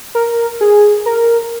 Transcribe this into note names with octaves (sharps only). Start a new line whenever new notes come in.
A#4
G#4
A#4